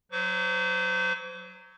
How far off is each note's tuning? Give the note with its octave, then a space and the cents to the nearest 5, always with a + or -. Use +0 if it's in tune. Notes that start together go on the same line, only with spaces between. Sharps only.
F#3 +0 C5 -35 C#6 +45